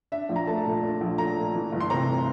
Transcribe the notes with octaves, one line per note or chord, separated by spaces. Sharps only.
D4 E5
A#1
A#5
A3 A5
A#2
D4
A#1
A3 A#5
A#2
E3
G1
C6
C3 A#5